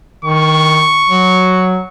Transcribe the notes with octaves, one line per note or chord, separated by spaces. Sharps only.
D#3 C#6
F#3